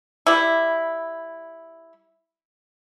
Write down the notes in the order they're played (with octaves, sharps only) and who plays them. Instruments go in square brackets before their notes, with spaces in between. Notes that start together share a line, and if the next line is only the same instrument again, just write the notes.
[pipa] G3 E4